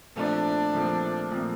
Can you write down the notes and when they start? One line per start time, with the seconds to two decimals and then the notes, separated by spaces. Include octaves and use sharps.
0.16 A#2 F3 A3 C4 D4
0.74 A#2 F3 A3 C4
1.31 A#2 F3 A3 C4